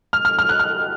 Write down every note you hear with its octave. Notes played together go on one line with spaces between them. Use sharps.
F6
F6
F6
F#6
F6